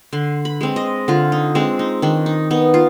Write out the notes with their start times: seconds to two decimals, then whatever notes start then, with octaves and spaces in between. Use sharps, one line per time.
0.13 D3 C6
0.45 B5
0.61 G#3 C4
0.76 D#5
1.08 D3 F4
1.32 D#4
1.55 G#3 C4 D4
1.79 D#4
2.02 D#3 D4
2.26 D#4
2.51 B3 D#4
2.74 F4